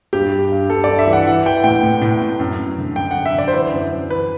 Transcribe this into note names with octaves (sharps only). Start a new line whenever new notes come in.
G2 G4
G2
G2
G2 A4
G2 D5
E5
E3
F#5
E3 F#5
E3 G5
A2 G5
A2
A2
A2
F#2
F#2
D3
F#2 G5
F#2 F#5
E5
D3 D5
C5
E3 B4
F#2
F#2
E3 B4